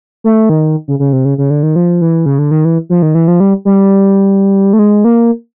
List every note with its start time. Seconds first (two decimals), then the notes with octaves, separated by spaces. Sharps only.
0.24 A3
0.49 D#3
0.88 C#3
0.99 C#3
1.13 C3
1.25 C#3
1.38 C#3
1.50 D3
1.63 D#3
1.76 F3
2.01 E3
2.26 C#3
2.38 D3
2.51 D#3
2.65 E3
2.90 F3
3.02 D#3
3.15 E3
3.28 F3
3.40 G3
3.65 G3
4.73 A3
4.79 G#3
5.04 A#3